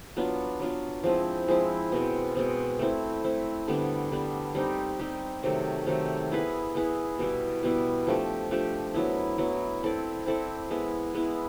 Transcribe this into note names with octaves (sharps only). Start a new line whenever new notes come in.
F#3 B3 D4 F4
F#3 B3 D4 F4
F3 G#3 C4 E4
F3 G#3 C4 E4
B2 G#3 C4
B2 G#3 C4
A3 C4 E4
A3 C4 E4
D3 G3 B3 D4
D3 G3 B3 D4
G3 C4 D#4 G4
G3 C4 D#4 G4
C3 D#3 F#3 A3
C3 D#3 F#3 A3
B3 E4 G#4 B4
B3 E4 G#4 B4
B2 G3 B3 E4
B2 G3 B3 E4
F3 A3 D4 G4
F3 A3 D4 G4
F#3 B3 E4
F#3 B3 E4
C4 E4 A4 D5
C4 E4 A4 D5
G#3 B3 E4
G#3 B3 E4